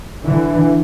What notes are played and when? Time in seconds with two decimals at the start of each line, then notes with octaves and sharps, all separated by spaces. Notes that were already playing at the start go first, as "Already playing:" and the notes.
0.25 D3 E3